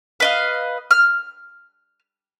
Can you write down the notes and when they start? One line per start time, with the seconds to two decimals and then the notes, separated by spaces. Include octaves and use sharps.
0.20 B4 D#5 F5
0.91 F6